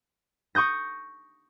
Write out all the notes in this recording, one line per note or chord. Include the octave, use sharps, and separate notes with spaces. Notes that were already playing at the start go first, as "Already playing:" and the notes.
C#6 D#6 G6 A#6